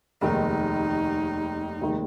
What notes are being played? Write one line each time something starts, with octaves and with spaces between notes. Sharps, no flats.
F1 D#2 D#3 G#3 D#4
F1 D#2 D#3 G#3